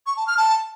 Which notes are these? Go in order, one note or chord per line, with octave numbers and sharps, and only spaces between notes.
C#6
A5
F6
A5